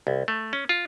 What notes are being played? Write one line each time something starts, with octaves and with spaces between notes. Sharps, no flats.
C2
A3
C#4
F4